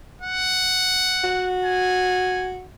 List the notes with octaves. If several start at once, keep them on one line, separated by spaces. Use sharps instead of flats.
F#5
F#4
G#5